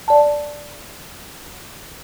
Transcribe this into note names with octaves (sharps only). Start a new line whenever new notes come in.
D5 A5